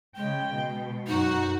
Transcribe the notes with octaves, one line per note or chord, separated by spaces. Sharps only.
C#3 G#3 G5
B2
F#2 D#4 F#4